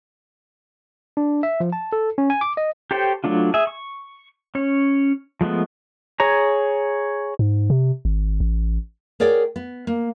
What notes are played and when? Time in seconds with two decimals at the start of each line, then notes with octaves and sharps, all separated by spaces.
1.17 D4
1.43 E5
1.60 F3
1.72 A5
1.93 A4
2.18 C#4
2.30 G#5
2.41 D6
2.57 D#5
2.91 G4 A4 C5 C#5 G5
3.24 F#3 A3 D4 F4
3.54 G#4 E5
3.67 C#6
4.55 C#4 C#5
5.41 F3 G#3 A3 B3
6.20 G#4 C#5 A#5
7.39 G#2
7.70 C3
8.05 G#1
8.40 A1
9.20 G#4 A#4 C#5 D5 F#5 G5
9.56 B3
9.87 A#3